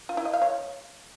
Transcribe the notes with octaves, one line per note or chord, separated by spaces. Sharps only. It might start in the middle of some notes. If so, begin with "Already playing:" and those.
F4
E4
D#5
F5
C#5